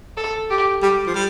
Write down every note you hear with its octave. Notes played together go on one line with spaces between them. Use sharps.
A4
G4
G3 G4
F3
G3